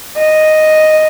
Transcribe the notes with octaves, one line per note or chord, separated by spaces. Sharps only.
D#5